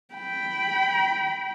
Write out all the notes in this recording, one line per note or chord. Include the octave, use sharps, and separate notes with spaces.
G5 B5